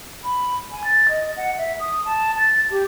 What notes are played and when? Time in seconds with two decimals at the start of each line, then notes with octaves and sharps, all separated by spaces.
0.24 B5
0.72 G#5
0.84 A6
1.09 D#5
1.37 F#5
1.58 E5
1.80 D#6
2.05 A5
2.38 A6
2.70 G4